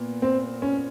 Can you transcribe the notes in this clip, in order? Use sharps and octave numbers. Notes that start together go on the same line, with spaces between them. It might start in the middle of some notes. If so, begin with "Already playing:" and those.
Already playing: A#2 B3
C4
C#4